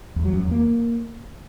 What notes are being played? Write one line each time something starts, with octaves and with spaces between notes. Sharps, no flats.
E2
F#3
F#2
E2
A#3